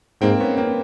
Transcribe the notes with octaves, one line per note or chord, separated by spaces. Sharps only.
G#2 A#3 C4
B3 C#4
A#3 C4